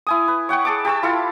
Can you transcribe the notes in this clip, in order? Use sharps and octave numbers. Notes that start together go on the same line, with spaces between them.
E4 G#5 D#6
B4
C#5 F#5 G5 C#6
G#4 A5 D6
G4 A5 C#6 E6
E4 F4 A4